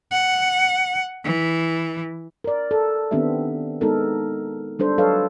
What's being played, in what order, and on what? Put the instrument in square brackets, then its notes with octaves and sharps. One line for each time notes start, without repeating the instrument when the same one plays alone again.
[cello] F#5
E3
[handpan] A#4 D5
A4
D#3 B3 C4 D4 G4 E5
G#3 B3 D#4 A4 A#4
G3 D4 A4 C5
F#3 A4 B4 C#5 D#5 F5